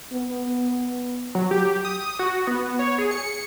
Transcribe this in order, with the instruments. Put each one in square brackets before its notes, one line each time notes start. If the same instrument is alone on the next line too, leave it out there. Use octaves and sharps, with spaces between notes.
[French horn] B3
[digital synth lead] F#3
G4
D#6
F#4
B3
C#5
G#4
C#7